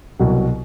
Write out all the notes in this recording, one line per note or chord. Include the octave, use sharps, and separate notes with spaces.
C2 B2 F#3